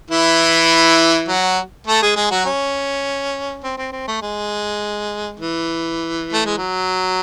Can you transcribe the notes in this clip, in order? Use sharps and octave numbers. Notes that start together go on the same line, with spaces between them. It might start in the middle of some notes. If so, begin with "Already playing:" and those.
E3 E4
F#3 F#4
A3 A4
G#3 G#4
G#3 G#4
F#3 F#4
C#4
C4
C4
C4
A3
G#3
E3
A3
G#3
F#3